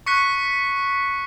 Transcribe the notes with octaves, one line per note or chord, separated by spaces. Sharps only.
C#6 F#6 B6 C#7